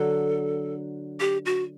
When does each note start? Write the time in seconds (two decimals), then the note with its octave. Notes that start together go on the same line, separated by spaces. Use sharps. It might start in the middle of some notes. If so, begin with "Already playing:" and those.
Already playing: D3 F#3 A4
1.20 G4
1.46 F#4